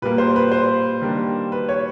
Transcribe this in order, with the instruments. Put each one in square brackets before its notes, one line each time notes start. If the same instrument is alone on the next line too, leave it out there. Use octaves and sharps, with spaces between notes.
[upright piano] A#2 G3 A#3 B4
C5
B4
C5
D#3 G3 A#3 D4
B4
C#5